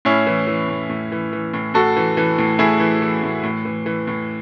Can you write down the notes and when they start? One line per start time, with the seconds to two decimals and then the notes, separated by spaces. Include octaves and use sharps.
0.05 A2 C#4 E4
0.27 E3
0.47 E3
0.69 A2
0.90 A2
1.12 E3
1.33 E3
1.54 A2
1.74 A2 F#4 A4
1.97 E3
2.17 E3
2.38 A2
2.59 A2 E4 G#4
2.80 E3
3.02 E3
3.24 A2
3.44 A2
3.65 E3
3.86 E3
4.07 A2